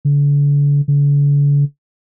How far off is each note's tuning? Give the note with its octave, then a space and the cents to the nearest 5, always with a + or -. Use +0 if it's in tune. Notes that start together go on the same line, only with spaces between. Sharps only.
D3 -40
D3 -45